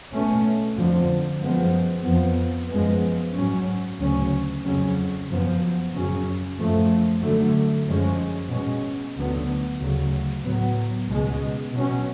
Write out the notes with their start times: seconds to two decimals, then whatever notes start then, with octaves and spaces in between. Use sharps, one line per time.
0.12 B2 A3 C#4
0.77 F2 D3 F3
1.41 F#2 F3 G#3 B3
2.06 F2 F3 B3
2.70 F#2 F3 G#3 B3
3.34 G#2 F#3 C#4
3.99 D2 C#3 F#3 C#4
4.64 F2 C#3 F#3 C#4
5.28 F#2 F3 B3
5.92 F#2 C#3 F#3 C#4
6.58 F#2 F3 A3
7.22 F#2 D3 F#3 A3
7.86 F#2 F3 G#3 C#4
8.51 B2 G#3 C#4
9.15 D2 D3 F#3 B3
9.80 D2 C#3 F#3
10.44 A2 F#3 B3
11.09 C#2 B2 G#3
11.73 B2 F#3 C#4